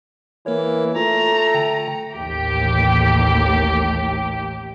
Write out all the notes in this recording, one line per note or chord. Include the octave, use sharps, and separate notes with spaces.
E3 A#3 A#4 C#5
A3 F4 A#5
D3 G5
A1 D#2 G4